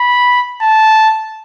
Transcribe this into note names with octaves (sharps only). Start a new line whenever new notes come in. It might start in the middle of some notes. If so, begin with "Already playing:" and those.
Already playing: B5
A5